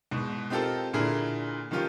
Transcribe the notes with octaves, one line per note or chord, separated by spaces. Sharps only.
E2 G#2 B2
C4 D#4 F4 G4 A4 A#4
A#2 D3 E4 G#4 A#4
D#3 F3 C#4 F4 G4 A#4